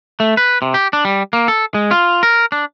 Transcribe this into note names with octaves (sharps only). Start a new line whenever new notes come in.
A3
B4
C3
G4
D4
G3
A#3
A4
G#3
F4
A#4
D4